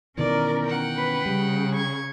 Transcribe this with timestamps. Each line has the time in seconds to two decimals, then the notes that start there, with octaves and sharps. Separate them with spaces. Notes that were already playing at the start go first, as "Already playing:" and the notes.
0.18 B2 D#3 E3 C#4 A#4 D5
0.64 F#5 G5
0.96 C#4 B4
1.26 C#3 G3
1.72 C#6 G#6